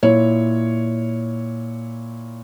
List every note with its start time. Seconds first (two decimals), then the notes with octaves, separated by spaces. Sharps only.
0.03 A#2 E4 C#5